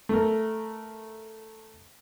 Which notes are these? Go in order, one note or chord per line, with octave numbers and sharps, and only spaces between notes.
A3 A#4